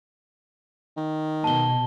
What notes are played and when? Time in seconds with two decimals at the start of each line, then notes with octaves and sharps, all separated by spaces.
0.97 D#3
1.44 B2 A5 G7